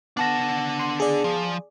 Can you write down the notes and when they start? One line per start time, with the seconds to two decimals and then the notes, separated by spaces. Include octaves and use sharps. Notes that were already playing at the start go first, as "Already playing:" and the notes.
0.17 B3 D4 F#5 A5 A#6
0.79 C6
1.00 G#4 D5
1.24 F3